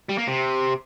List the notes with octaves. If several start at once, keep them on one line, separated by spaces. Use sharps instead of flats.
G3
A#3
C3